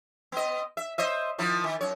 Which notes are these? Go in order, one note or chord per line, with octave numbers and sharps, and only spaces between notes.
B3 D#5
E5
C5 D#5 E5
D#3 F3 E4
D#3
F#2 C#5